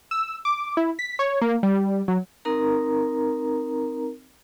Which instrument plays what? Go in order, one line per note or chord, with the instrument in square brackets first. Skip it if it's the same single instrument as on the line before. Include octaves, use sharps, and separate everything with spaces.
[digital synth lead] E6
D6
E4
B6
C#5
A#3
G3
F#3
[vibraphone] C4 D#4 A#4 A#5